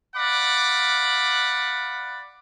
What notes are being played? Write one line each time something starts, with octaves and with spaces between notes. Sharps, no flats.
D5 F5 F#5 B5 D6